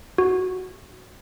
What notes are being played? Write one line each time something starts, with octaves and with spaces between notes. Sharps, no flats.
F#4